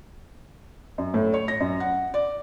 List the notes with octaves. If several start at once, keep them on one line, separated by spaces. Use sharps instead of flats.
F#2
A2
C#5
A#6
F#2
F#5
D5